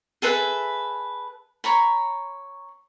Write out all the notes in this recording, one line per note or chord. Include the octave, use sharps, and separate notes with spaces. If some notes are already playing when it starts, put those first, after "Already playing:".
G#4 A4 B4 E5
C#5 A#5 B5